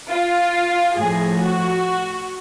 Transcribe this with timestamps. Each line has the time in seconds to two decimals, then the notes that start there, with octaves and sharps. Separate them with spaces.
0.10 F4
0.99 A2 F3 G#4
1.42 F#4